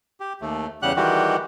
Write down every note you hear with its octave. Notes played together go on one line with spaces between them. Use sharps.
G4
D#2 A3
E2 C#3 G3 G4 F#5 F#6
D#3 E3 G3 G#3 F#4 G4